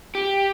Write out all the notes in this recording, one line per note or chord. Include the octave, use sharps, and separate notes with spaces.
G4